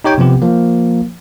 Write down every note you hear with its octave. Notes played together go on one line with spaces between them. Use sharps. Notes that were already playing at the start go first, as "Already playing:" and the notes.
D#4 G4 C#5 G5
C3 F3 B3 G4
F3 A#3